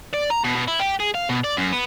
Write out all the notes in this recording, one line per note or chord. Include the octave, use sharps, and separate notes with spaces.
D5
A#5
B2
B2
E4
G4
G#4
F5
B2
D5
F#2
B3